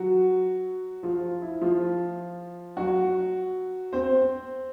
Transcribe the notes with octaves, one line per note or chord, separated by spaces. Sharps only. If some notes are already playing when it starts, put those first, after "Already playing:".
Already playing: F#3 F#4
F3 F4
E4
F3 F4
F#3 F#4
C4 C5